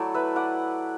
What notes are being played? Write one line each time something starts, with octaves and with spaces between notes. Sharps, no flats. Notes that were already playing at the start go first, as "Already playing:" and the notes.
Already playing: F#3 A3 E4 A4 D5
B4 E5
D5 F#5